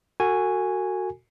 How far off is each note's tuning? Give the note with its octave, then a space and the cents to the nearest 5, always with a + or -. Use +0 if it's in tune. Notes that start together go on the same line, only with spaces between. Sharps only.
F#4 +0 A4 +40 G#5 -5